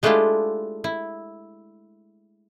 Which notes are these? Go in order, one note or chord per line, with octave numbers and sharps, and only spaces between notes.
G#3 A3 D4 E4 F4 G4
E4